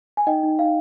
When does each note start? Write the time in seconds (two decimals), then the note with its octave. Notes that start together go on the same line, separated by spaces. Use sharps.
0.17 G#5
0.27 D#4 D#5 G5
0.43 D#4
0.59 D#4 F5